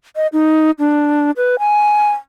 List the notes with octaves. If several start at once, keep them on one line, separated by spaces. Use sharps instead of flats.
D#5
D#4
D4
B4
G#5